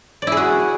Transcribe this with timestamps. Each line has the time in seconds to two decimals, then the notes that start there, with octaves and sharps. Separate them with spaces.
0.22 D5
0.27 E4
0.32 G#4
0.37 F#4